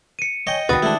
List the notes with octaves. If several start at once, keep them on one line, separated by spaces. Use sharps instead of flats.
C#7 D#7
C#5 D#5 G5 G#5
D#2 B2 D3 D#3 F#4 B4 D#6 A6
G#3 A3 D4 E4 F#4